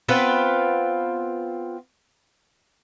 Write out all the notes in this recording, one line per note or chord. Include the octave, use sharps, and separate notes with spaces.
B3 C4 F4 B4